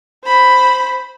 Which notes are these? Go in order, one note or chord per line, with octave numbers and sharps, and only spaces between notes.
C5 B5